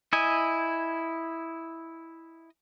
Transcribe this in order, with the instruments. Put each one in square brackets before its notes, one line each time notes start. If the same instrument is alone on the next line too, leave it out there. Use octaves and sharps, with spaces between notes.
[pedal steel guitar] E4 D#5 G#5